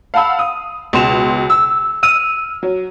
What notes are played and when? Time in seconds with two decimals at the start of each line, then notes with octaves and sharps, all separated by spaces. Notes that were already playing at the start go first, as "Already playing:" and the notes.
0.14 F5 F#5 A5 B5 E6
0.39 D#6
0.93 C#2 B2 C6 E7 F7
1.50 E6
2.03 E6 F6 D#7
2.63 F#3